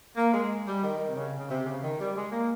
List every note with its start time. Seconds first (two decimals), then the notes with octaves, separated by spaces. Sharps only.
0.17 A#3
0.34 G#3
0.67 G3
0.83 D#3
1.07 C3
1.16 C#3
1.39 C#3
1.50 C3
1.66 C#3
1.83 D#3
2.00 G3
2.16 G#3
2.32 A#3